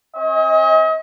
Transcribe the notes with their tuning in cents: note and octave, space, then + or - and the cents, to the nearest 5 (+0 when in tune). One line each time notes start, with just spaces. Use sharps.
C#4 -40 D#5 +40